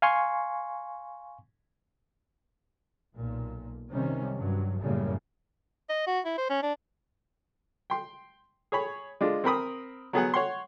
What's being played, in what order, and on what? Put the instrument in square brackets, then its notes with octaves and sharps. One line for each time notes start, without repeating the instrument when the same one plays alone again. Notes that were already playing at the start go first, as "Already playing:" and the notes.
[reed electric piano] F5 G#5 C6 C#6
[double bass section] B1 A#2
C3 D#3 G3 C#4
G2 F#3
F#2 A2 C#3 G3 A#3
[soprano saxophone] D#5
F#4
E4
C5
C#4
D4
[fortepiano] G5 C6
G#4 C#5 B5
G#3 D4 F4
C4 A#4 B5 D#6
F#3 B3 G#4 F#5
C#5 F#5 C6